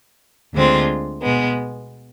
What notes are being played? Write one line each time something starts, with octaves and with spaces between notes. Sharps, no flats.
D2 D3 G#3 C4 F4
B2 G#3 B3